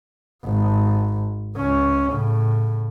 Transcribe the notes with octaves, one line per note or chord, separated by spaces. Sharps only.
G#1
C#2 C#4
A2 C#3